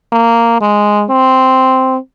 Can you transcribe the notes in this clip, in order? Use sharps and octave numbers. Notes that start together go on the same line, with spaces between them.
A#3
G#3
C4